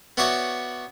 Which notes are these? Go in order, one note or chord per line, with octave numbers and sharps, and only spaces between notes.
B3 E4 F#4 C#5 D5 E5